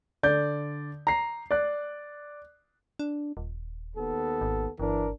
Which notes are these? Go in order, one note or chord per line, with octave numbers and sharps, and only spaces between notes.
D3 D5 G6
A#5 C7
D5 F#6
D4
D#1
D#2 B3 A4
G#1
G1 E3 D4 A#4